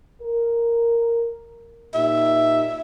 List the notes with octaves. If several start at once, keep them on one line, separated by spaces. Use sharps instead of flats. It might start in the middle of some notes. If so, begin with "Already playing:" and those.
A#4
A#2 D#4 G4 E5